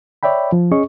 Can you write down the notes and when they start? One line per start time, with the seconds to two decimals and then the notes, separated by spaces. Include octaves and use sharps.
0.23 C#5 D5 E5 G5 B5
0.52 F3
0.71 C#4 G#4 D#5 C#6